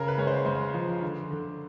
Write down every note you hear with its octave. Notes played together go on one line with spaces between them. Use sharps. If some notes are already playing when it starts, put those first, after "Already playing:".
Already playing: C#3 A#4
B4
G#3 C#5
C5
G#3 C5
F3
D3
D3